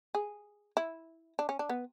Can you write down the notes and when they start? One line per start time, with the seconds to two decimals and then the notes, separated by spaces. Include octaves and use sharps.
0.15 G#4
0.77 E4
1.39 D4
1.49 C#4
1.59 D4
1.69 B3